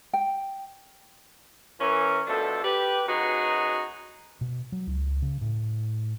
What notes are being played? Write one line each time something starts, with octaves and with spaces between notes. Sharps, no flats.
G5
E3 C#4 A#4
B2 F3 A3 D4 A4
G4 B4
F#2 D#4 F#4 G#4 B4 A#5
B2
F#3
C#2
C#3
A2